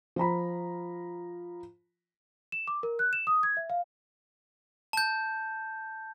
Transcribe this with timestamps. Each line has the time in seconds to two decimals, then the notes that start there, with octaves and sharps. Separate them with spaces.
0.16 F3 F4 A#5 B5
2.52 E7
2.68 D6
2.83 A#4
2.99 F#6
3.13 E7
3.27 D#6
3.43 G#6
3.57 E5
3.70 F5
4.93 A5 G6